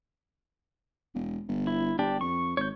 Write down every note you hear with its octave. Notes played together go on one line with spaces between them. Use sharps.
E1
G1
E4
G1 D4 G4
F2 C#6
G#1 C#5 G6